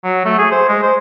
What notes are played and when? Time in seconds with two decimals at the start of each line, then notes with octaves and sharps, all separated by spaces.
0.04 F#3
0.25 A3
0.39 G#4
0.52 C5
0.68 G#3
0.83 C5